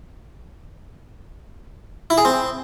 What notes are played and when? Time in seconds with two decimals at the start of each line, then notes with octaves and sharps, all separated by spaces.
2.10 E4
2.18 G#4
2.25 C4